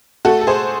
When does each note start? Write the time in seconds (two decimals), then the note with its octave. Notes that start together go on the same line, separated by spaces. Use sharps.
0.25 A3 F#4 A4
0.41 A4
0.47 G#4 C5